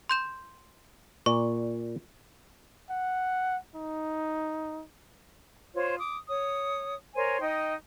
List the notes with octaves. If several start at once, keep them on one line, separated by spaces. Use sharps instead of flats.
C6 G6 E7
A#2 D5 C#6
F#5
D#4
F4 C5 C#5
D6 D#6
C#5 D#6
A#4 C5 C#5 G#5
D#4 D#5 G5